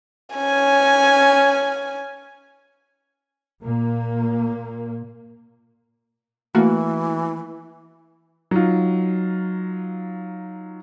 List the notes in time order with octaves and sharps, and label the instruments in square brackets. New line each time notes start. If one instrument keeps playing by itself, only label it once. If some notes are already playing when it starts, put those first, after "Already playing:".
[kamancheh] C#4 G#5
[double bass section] A#2 A#3
[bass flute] E3 [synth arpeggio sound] A3 A#3 F#4
[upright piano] F#3 D#4 F4